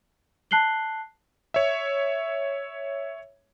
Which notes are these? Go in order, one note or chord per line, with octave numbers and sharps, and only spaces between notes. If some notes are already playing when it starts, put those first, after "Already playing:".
A5 F#6 C7 F#7 G7
C#5 E5